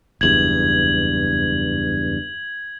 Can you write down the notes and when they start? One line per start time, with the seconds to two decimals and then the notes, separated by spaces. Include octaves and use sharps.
0.21 F#1 E2 G2 G#6 F#7